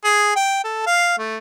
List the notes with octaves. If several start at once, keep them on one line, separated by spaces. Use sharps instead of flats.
G#4
G5
A4
F5
A3